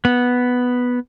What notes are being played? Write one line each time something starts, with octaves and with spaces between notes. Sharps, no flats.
B3